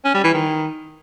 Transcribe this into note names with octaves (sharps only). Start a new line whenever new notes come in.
C#4
G3
E3
D#3